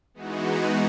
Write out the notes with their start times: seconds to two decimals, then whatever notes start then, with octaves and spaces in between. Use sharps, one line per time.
0.14 E3 G#3 B3 D#4 F#4